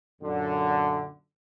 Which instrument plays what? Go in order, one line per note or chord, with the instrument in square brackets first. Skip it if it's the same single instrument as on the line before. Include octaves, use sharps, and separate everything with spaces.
[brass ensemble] F#2 A#2 D3